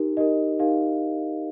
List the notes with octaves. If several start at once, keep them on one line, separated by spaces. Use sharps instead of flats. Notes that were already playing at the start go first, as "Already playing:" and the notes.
Already playing: D#4 G4 A#4
D#4 G4 A#4 D#5
D#4 G4 A#4 F5